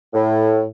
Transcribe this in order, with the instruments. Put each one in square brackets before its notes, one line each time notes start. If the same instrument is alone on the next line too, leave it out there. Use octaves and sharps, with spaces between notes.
[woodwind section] A2